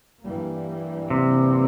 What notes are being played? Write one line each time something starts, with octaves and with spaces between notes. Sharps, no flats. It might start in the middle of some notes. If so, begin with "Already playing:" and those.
G2 E3 G3 A#3
C3